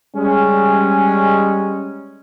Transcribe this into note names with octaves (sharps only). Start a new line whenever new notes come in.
G3 G#3 C#4